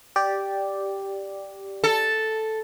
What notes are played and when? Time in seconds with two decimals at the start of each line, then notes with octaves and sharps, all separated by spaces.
0.16 G4 D5
1.84 A4